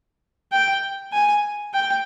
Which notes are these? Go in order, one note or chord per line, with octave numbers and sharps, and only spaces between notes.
G5
G#5
G5